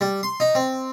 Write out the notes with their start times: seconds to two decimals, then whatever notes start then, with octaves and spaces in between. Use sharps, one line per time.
0.01 G3
0.23 C6
0.40 D#4
0.55 C4